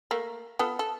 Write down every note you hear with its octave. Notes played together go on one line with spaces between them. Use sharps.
A3 A#3
B3 F4 A4
A4